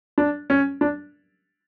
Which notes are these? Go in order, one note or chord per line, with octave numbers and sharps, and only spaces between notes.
D4
C#4
D4